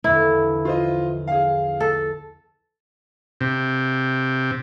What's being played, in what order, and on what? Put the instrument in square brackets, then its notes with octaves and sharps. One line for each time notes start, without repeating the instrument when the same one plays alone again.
[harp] A#1 E2 D3 [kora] E4
[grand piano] F4 C5 D#5
G#4 F5
[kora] A4
[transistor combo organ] C3